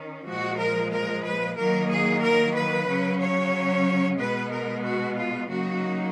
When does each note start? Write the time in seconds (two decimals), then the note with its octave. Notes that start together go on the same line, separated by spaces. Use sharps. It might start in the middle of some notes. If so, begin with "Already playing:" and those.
Already playing: D#3 C#4
0.26 A#2 F3 G#3 F#4
0.58 A#4
0.90 A#4
1.23 B4
1.56 D#3 F#3 A#3 A#4
1.90 G#4
2.21 A#4
2.54 B4
2.87 C#3 F#3 C#4
3.20 C#5
4.18 B2 G#3 B3 B4
4.51 A#4
4.83 F#4
5.16 F4
5.49 C#3 F#3 A#3 D#4 F#4